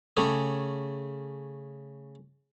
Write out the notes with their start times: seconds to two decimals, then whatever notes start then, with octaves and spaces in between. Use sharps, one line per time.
0.17 C#3 A3 C#4 G4 G#4